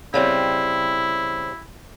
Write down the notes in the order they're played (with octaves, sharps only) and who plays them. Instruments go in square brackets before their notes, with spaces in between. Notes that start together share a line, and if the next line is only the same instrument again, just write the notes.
[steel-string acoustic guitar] C#3 G3 C4 [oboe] E4